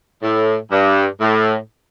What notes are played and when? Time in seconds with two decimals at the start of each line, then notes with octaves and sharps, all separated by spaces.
0.23 A2
0.72 G2
1.21 A2